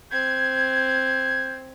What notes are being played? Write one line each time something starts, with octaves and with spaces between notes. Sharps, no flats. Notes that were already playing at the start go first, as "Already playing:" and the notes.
C4 G6 G#6